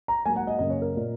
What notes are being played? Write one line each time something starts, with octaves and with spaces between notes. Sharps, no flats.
A#5
G#2 F#3 A#3 G#5
F#5
D#5
F#2 C#3 A#3 D#5
C#5
A#4
A#2 A#3